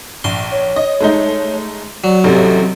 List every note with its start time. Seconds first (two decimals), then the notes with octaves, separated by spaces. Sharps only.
0.24 A#1 C6
0.52 C#5
0.76 D#5
1.00 G#3 A3 D#4
2.04 F#3 D5
2.24 A1 C3 G3 A4